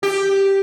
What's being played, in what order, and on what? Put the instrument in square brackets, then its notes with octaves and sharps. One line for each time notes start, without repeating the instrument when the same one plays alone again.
[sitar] G4